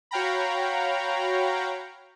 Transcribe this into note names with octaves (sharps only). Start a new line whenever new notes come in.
F#4 C#5 F5 G5 A#5 B5